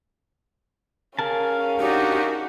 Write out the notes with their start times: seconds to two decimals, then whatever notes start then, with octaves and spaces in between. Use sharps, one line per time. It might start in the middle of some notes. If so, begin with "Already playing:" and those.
1.19 C#4 G#4 A#4 F5 A5
1.79 D4 D#4 F#4 G4